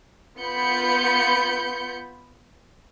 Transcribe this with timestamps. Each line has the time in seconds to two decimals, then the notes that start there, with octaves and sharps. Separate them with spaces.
0.38 B3 F4 B5 G6 C#7